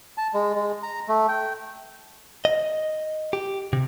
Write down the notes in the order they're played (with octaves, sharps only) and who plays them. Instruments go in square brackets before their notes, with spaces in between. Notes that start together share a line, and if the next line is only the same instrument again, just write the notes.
[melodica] A5
G#3
G#3
A#5
A3
G5
[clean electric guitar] D#5
G4
C3